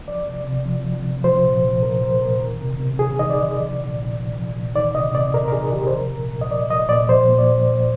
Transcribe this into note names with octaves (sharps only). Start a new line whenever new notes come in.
F3 D5
C3
C3
F3
F3
C3
F3 C5
A#2
A#2
F3 A#4
F3 C5
A#2 A#4
D#3
C3
C3
D#3 G#4
D#3 D#5
D5
C3
F3
A#2
A#2
F3
F3
A#2
D#3 D5
C3 D#5
C3 D5
D#3 A#4
A#4
D#3 G#4
C3 G4
C5
F3 A#4
A#2
A#2
D#5
F3 D5
F3 D#5
A#2 D5
F3 C5
A#2
D5
A#2
F3